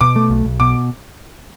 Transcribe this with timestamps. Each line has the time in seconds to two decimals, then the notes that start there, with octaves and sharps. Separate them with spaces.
0.01 B2 D6
0.16 A3
0.30 B1
0.45 B1
0.60 B2 D6